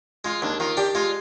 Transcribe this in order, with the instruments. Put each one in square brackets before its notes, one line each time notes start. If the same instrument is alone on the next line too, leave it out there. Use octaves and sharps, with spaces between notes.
[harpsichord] G#3 [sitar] F4
[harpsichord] D#2 [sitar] D4
[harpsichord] D#3 [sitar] F4
[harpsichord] D4 [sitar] G4
[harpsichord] G#3 [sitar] F4